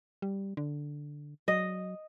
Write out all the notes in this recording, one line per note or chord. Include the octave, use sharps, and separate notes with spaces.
G3
D3
F#3 D#5